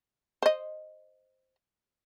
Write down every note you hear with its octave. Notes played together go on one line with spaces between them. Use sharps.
C5 D#5